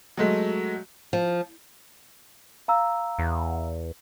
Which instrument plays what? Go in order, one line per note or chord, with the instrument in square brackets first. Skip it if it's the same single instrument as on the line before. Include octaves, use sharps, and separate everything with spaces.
[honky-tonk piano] F#3 G#3 A3
[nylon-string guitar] F3
[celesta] F5 A#5 E6
[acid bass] E2